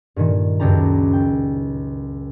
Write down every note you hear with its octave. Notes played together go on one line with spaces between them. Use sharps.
G2 A#2 D#3
C#2 F#2 C#3 G4 A5 A#5
G5